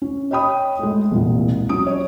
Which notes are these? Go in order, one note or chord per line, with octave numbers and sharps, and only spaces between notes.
C#4
C#5 D#5 G5 B5 D#6
G#3 A3
E1 C2 A#2
F#3 C#4 D#6 D7
C#5 D5